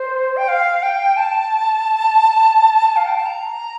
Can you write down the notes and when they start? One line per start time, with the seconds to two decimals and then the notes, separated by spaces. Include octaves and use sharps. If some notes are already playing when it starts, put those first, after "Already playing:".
Already playing: C5
0.37 G5
0.48 F5
0.83 G5
1.17 A5
2.96 F5
3.06 G5
3.15 A5
3.26 A#5